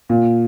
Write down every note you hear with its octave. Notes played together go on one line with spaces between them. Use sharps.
A#2